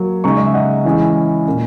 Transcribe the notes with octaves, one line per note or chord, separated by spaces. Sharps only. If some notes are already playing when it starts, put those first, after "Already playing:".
Already playing: F#3 A#3
C#3 G#3 D#4 A#5 C#6
D#5
E5
D#5 F#5
E3 G#3 C#4 E4
A#2 A#3 C#4